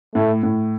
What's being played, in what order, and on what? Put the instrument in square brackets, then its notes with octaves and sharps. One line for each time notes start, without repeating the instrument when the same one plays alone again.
[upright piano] A2 [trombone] A3
[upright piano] A2